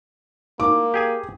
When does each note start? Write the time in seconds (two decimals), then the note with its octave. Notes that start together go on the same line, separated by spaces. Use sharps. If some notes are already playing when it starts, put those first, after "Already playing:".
0.60 A#3 D6
0.94 G4 G#4 G#5